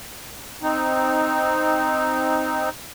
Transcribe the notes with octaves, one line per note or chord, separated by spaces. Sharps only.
C4 D#4